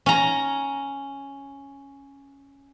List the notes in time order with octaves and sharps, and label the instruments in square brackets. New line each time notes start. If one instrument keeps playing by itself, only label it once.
[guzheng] C#4 A#5